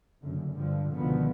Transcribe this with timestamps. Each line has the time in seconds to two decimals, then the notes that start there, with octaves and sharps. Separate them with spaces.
0.21 F#1 F#2 D3
0.52 G2 D3 F3
0.91 C#2 B2 D3 D#3 F3 B3